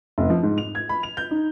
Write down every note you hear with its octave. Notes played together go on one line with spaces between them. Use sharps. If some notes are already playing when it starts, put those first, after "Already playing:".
F1
F3
G#2
F7
G#6
B5
F7
G6
D#4